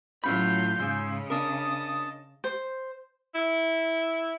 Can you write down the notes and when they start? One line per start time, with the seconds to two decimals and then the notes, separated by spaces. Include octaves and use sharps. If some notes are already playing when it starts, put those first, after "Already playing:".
0.24 A2 F#3 C#4 F4 B5 G6
0.79 G#2 C#3 G#5 C6 E6
1.30 D4 A#4 D#5 A5 D#6
2.44 C5
3.35 E4